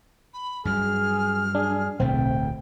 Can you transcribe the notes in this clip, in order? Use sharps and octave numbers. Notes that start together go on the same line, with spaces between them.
B5
G2 F#3 G#4 F6
D4 G#4
D1 B1 A3 C4 G5